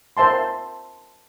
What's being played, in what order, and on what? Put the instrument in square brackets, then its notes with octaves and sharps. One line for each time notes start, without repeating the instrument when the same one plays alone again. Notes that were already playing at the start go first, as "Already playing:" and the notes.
[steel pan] A#4 C5 E5 A5 C6